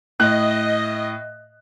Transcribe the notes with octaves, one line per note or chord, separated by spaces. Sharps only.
A2 D#5 F#6